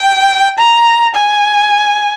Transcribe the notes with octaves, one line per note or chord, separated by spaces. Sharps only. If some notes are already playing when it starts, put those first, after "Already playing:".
Already playing: G5
A#5
G#5